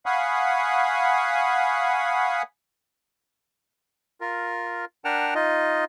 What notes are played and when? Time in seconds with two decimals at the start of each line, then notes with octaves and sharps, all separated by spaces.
0.06 F5 F#5 G#5 B5 C#6 D#6
4.21 F4 A#4
5.05 D4 A#4 F#5 G5 A5 F6
5.35 D#4 F4 D#5